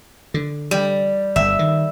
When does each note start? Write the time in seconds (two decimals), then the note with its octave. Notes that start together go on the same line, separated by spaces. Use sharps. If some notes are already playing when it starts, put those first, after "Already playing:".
0.34 D3
0.71 G3
1.36 G1 E5
1.59 D#3